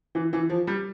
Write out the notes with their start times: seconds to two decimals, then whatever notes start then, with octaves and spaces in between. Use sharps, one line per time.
0.15 E3
0.33 E3
0.50 F3
0.67 G3